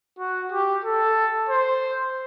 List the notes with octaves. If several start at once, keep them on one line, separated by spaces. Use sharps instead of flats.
F#4
G4
A4
C5